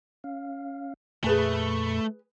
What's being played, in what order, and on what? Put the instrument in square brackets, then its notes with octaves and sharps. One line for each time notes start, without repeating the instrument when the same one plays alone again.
[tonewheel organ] C#4 F5
[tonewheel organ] F2 A#2 B5 [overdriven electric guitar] A3 [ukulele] G#4 B4 G#5